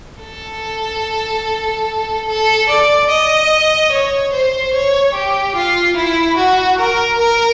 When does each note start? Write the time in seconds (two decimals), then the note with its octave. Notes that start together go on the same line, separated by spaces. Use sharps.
0.23 A4
2.28 A4
2.69 D5
3.09 D#5
3.92 C#5
4.32 C5
4.73 C#5
5.14 G4
5.55 F4
5.96 E4
6.36 F#4
6.78 A#4
7.19 A#4